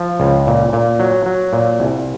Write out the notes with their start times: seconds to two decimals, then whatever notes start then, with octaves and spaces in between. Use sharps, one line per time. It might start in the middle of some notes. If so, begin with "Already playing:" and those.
Already playing: F3
0.20 C#2
0.47 A#2
0.73 A#2
1.00 F#3
1.26 F#3
1.53 A#2
1.80 C2